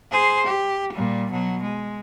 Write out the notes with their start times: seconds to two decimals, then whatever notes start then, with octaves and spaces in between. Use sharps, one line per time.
0.12 G#4 C5
0.45 G4
0.92 A#2 G3
1.31 B2 F#3
1.62 G#3